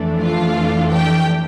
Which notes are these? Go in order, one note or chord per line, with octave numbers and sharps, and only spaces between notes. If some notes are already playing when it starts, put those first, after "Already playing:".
Already playing: F2 E3 A3 D4
F4 F5
G4 G5